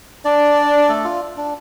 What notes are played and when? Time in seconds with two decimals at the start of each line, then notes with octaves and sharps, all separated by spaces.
0.25 D4 D5
0.89 A3 A4
1.04 F4
1.37 D4